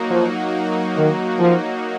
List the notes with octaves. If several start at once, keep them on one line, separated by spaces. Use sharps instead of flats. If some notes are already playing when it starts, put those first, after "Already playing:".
Already playing: F#3 A#3 D#4 F#4
F3
D#3
F3